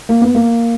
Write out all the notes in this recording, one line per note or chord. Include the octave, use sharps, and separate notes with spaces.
A#3
B3
A#3